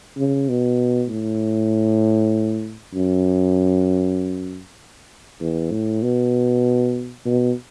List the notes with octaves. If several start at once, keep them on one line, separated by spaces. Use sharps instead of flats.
C#3
B2
A2
F#2
E2
A2
B2
B2